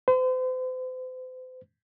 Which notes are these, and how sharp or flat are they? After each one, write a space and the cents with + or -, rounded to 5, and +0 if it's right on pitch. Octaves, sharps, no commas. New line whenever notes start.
C5 -40